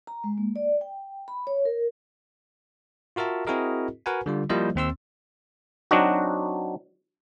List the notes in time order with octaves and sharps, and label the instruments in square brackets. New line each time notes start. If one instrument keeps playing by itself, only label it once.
[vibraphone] A#5
G#3
A#3
D5
G5
B5
C#5
A#4
[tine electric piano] F4 F#4 A#4 E5 A5
C4 E4 F#4 G#4 A#4 D#5
F#4 A#4 B4 F#5 G#5
D3 G3 F4
F3 G3 A#3 E4 C5 D#5
D#2 C4 C6 E6
[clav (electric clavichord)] F#3 C4 D4 D#4 F#4